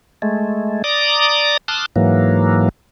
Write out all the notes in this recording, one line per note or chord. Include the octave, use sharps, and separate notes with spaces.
G#3 A3
D5 A#5 D6 D#6
A5 C6 D6 D#6 F6 F#6
G#2 E3 F#3 A#3